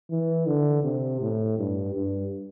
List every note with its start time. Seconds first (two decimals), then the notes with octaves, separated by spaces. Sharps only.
0.10 E3
0.47 D3
0.84 C3
1.21 A2
1.58 G2
1.94 G2